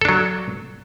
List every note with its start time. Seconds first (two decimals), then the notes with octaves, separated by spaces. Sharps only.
0.01 A4
0.05 D4
0.09 F#3